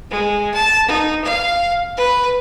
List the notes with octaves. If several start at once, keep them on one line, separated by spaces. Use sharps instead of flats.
G#3
A5
D#4
F5
B4